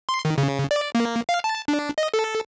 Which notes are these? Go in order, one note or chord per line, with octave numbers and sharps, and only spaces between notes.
C6
D#3
C#3
D5
A#3
F5
A5
D4
D#5
A4